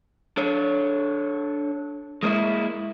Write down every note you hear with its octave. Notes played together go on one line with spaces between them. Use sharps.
D4 A4 C#5
G#3 A#3 D4 E4